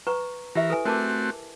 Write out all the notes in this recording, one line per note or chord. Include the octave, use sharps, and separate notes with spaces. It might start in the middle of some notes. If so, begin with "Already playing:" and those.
B4 A#5 C#6
E3 E4 G4 A#4 E5
A4 B4 G#5
A3 C4 F#4 A#4 A5 D6